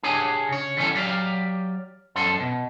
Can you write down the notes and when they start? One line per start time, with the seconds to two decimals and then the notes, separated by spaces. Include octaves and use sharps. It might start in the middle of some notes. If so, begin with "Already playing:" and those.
0.03 D4 G4 G#4 C#5 G#5
0.48 C#3 C#5
0.77 D3 E3 G3 C#4 A4
0.95 F#3 G4 D5 F5
2.16 F#2 F3 A4 C6
2.40 B2